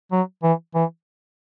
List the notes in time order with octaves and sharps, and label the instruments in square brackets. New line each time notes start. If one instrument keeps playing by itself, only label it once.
[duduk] F#3
E3
E3